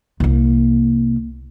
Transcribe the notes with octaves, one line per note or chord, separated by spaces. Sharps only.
C2 A#3